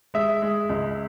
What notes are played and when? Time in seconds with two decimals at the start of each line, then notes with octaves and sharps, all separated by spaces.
0.14 G#3 E5
0.42 G#3
0.69 C#2